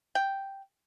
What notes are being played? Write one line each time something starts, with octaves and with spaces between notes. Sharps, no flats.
G5